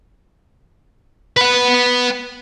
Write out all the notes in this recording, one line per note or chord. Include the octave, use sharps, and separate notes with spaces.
B4 F#5